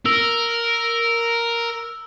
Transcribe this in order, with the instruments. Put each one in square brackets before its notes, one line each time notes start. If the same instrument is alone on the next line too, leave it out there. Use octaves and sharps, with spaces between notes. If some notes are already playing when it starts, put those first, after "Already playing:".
[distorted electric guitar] A#4 [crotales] E6